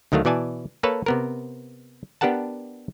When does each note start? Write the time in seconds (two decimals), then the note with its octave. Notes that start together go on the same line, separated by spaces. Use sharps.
0.12 D2 D#3 F#3 A3 F5
0.25 B2 E3 D5 G#5 A5
0.83 A#3 A4 B4 C#5 A5
1.06 C3 B3 A#4
2.21 B3 D4 G4 A#4 F#5 A5